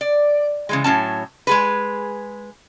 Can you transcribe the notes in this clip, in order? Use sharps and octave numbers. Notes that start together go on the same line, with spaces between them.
D5
C#3 E3 G#3
A2 F#3 C#4 A5
G#3 G#4 B4